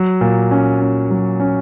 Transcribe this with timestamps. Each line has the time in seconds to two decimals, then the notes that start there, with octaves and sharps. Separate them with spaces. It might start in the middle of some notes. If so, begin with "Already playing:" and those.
Already playing: F#3
0.21 A#2
0.51 C#4
0.81 C#4
1.10 F#3
1.40 C#4